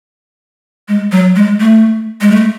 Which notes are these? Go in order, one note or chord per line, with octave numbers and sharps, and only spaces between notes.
G#3
F#3
G#3
A3
G#3
A3